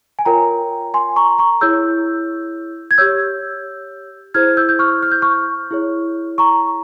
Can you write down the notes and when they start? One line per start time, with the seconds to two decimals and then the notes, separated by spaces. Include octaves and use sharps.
0.19 G#5
0.25 F4 A#4 C#5 G5 A#5
0.94 G#5 C6
1.16 A#5 C#6
1.38 A#5 C#6
1.61 E4 G#4 C#5 E6 G6
2.91 G#6
2.98 G4 C#5 E6 G6
4.34 E4 G#4 C5 F6 G#6
4.57 E6 G6
4.69 G6
4.79 C#6 F6
5.03 F6
5.12 G6
5.22 C#6 F6
5.71 E4 G#4 C#5
6.38 A#5 C#6